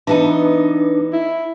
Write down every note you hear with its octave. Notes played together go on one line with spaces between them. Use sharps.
E3 B3 D4 D#4
E4